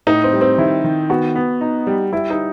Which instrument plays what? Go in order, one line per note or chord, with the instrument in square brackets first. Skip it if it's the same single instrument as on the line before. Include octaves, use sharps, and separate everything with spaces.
[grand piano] A2 [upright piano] D#4
[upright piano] C4
[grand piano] G3
[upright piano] C4
[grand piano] D#3 [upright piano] E4
[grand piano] D#3
[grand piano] B3 [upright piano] F#4
[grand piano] B3
D#4
G3
[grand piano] G3 [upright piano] E4
[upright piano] D#4